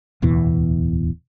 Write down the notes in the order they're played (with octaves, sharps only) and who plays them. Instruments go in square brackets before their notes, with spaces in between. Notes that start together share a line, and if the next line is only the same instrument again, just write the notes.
[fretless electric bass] D1 E2 B2 E3